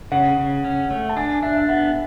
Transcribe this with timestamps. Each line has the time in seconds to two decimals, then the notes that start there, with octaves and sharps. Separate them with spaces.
0.12 C#3 F#5
0.38 C#3
0.64 C#4
0.91 A3
1.09 A5
1.17 D4 G#5
1.43 D4 E5
1.57 E5
1.69 B3 F#5